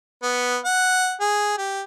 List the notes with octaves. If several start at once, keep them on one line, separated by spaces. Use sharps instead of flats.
B3
F#5
G#4
G4